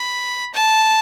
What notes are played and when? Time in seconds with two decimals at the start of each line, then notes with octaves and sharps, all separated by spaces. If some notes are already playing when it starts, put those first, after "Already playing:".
Already playing: B5
0.54 A5